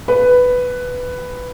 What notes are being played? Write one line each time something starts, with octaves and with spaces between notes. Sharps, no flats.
B4